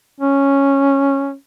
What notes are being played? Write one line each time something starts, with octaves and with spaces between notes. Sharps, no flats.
C#4